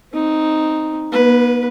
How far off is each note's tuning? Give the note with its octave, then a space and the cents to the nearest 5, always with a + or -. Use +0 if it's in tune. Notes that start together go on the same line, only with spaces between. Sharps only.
C4 +0 D#4 +0
B3 -45 B4 +0